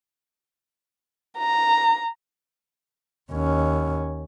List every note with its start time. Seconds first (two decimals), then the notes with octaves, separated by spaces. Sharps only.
1.38 A#5
3.32 D#2 C#4